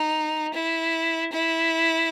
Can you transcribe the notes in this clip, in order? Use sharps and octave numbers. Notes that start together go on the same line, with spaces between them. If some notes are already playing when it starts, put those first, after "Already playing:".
Already playing: D#4
E4
E4